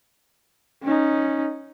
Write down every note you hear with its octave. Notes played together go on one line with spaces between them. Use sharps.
C#4 D#4